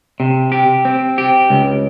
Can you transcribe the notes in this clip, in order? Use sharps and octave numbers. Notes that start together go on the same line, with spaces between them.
C3
G4
C4
G4
C#2